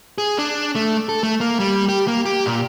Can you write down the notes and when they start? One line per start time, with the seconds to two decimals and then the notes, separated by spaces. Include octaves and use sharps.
0.18 G#4
0.38 D4
0.75 A3
1.09 A4
1.23 A3
1.41 A#3
1.60 G3
1.89 G4
2.08 A#3
2.26 G4
2.46 A#2